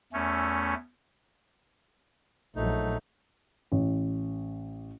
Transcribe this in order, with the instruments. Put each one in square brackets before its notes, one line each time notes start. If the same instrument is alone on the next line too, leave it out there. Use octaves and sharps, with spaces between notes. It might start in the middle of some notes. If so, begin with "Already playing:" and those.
[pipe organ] E2 A3 C#4
[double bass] A#1 F#3 [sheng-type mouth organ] A3 D#4
[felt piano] A1